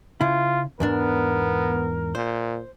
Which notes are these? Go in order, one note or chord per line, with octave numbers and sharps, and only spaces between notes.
C#3 E4 F4
E2 G#2 B3 D4 A#4
A#2 C5